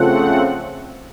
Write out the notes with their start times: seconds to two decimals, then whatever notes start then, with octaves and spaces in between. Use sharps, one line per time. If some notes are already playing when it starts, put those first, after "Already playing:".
Already playing: C#3 F3 A3 C4 F#5